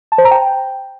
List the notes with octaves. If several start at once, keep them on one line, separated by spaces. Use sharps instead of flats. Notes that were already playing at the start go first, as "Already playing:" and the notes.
A5
C5
A#5
G5